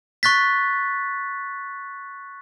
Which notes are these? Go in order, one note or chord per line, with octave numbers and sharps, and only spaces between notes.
C#6 F#6 A6 B6